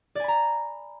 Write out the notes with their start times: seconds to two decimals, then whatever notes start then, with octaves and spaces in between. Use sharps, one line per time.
0.15 D5
0.20 G#5
0.24 B5
0.28 A#5